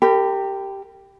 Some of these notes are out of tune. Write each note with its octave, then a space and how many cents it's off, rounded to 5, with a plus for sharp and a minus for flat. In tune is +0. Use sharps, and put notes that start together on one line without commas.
G4 +0 A#4 -35 B5 +30